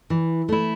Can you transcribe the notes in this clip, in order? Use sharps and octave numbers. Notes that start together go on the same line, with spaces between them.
E3
A3 E4